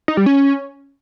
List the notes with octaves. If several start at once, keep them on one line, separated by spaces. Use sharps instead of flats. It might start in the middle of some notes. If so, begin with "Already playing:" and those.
D#4
G3
C#4